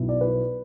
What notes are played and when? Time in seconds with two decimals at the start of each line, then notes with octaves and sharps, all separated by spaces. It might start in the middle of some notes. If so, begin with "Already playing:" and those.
Already playing: B1 B2 B3 E4
0.09 D5
0.21 B4